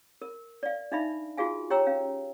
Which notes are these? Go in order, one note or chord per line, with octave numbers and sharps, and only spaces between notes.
A#4
D5 F5
D4 D#4 E5 F5 B5
F4 F#4 G#4 F5 G#5
G4 C#5 G5 A#5 E6
C#4 F5